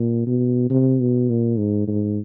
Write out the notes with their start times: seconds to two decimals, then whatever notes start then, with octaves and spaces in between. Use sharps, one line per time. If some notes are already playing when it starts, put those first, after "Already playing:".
Already playing: A#2
0.26 B2
0.70 C3
1.00 B2
1.29 A#2
1.58 G#2
1.87 G#2